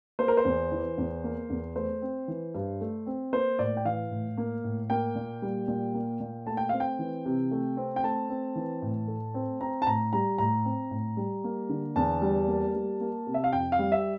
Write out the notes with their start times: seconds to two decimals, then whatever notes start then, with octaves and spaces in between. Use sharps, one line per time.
0.19 A#3 C5
0.28 A#4
0.37 C5
0.45 E2
0.72 E3
0.98 E2
1.24 A#3
1.50 E2
1.75 A3 C5
2.02 C4
2.28 E3
2.55 G2
2.81 A3
3.06 C4
3.33 A#3 C5
3.59 A2 D5
3.77 G5
3.85 E3 F5
4.11 A2
4.37 A#3
4.64 A2
4.90 A#3 G5
5.16 A#2
5.42 G3
5.68 A#2
5.94 A#3
6.20 A#2
6.46 A3 A5
6.57 G5
6.69 C4 F5
6.80 G5
6.99 E3
7.26 C3
7.51 A3
7.77 C4
7.96 G5
8.04 A3 A5
8.30 C4
8.56 E3
8.82 A2
9.08 A3
9.34 C4
9.61 C4 A#5
9.82 A5
9.87 A2 A#5
10.13 G3 A#5
10.38 A2 A#5
10.65 C4
10.91 A2
11.17 G3
11.44 A#3
11.69 D3
11.96 E2 A5
12.22 G3
12.48 A#3
12.74 G3
13.01 A#3
13.27 C3
13.34 E5
13.44 F5
13.53 F2 G5
13.72 F5
13.79 G3
13.92 E5